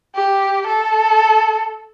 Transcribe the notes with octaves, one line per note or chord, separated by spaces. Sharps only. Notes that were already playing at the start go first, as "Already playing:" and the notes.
G4
A4